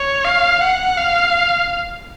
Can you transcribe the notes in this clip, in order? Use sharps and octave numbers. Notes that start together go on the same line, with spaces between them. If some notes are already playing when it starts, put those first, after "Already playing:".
Already playing: C#5
F5
F#5
F5